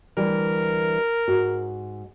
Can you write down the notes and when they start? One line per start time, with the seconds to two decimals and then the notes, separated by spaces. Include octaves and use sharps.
0.17 D2 E3 G3 A#4
1.28 G#2 F#4